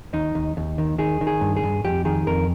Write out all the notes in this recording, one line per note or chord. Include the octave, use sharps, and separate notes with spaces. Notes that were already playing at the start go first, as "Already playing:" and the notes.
D#2 D#4
D#2
D#2
D#3
D#3 G#4
D#3
G#4
G2
G#4
G2
F2 G4
D#3 G#4
F2 A#4